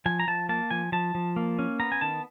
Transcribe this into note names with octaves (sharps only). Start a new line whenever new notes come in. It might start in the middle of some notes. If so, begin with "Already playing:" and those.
F3 G#5
A#5
F3 A5
A#3 A5
F3 G#5
F3 A5
F3
A#3
C#4
B3 A#5
G#5
D#3 A5